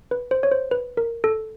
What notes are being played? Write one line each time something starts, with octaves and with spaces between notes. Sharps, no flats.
B4
C5
C#5
C5
B4
A#4
A4